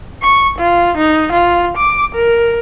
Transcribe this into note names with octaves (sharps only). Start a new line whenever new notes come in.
C#6
F4
D#4
F4
D6
A#4